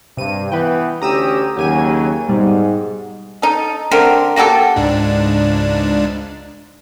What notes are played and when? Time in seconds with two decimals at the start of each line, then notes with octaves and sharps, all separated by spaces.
0.17 G2 C3 D#7
0.52 E3 B3 B4 G5
1.02 D2 C#4 G4 A#5 D#6 E6
1.57 D#2 C#3 F#3 G4 G#5 D#7
2.29 G#2 B2 G3
3.42 D#4 A4
3.91 D3 A3 C4 A#4
4.36 A#3 F#4 G4 A4
4.76 C#2 G#2 D4